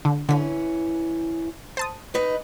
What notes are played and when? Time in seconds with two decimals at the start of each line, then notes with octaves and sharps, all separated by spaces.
0.05 D3
0.29 D3 E3 C#4
1.77 C5 A5 D#6
2.14 D#4 B4 D#5